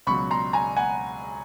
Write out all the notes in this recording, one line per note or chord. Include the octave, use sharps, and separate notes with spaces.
C#2 B2 F#3 B5 C#6
A#5 C6
G#5 A#5
F#5 G#5